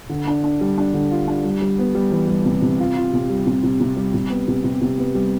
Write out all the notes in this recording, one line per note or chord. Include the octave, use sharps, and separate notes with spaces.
D3
D4
D4
G3
D4
D3
F4
D4
G3
G3
B3
G3
E3
G3
C3
C3
F4
F4
C3
G3
C3
C3
C3
G3
C3
B3
C3
C3
C3
B3
G3